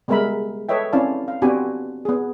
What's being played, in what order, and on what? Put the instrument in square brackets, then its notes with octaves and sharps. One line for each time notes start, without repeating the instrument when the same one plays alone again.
[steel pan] G3 G#3 B3 A#4 E5 B5
A4 B4 C#5 D#5 E5 G5
C4 C#4 E4 D5 F5 A5
F5
B3 C4 D4 F#4 G4 G#5
B3 G#4